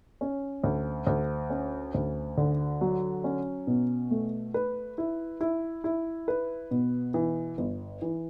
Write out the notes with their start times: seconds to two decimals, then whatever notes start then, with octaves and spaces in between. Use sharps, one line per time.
0.21 C#4
0.64 D2
1.07 D2
1.50 C#4
1.94 D2
2.37 D3
2.81 F#3
3.24 C#4
3.67 B2
4.11 A3
4.54 B4
4.98 E4
5.41 E4
5.84 E4
6.28 B4
6.71 B2
7.14 E3
7.58 G1
8.02 E3